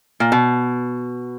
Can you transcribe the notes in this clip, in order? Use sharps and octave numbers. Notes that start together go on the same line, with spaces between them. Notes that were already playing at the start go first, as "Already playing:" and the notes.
A#2
B2